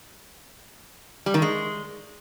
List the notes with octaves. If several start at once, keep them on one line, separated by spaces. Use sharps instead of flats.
G3
D#3
G#3